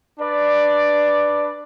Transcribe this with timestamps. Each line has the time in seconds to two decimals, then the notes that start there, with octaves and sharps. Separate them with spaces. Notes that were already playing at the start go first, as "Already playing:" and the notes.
0.19 D4 B4 D5